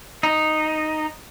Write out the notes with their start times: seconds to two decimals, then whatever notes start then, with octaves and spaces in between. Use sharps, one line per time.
0.23 D#4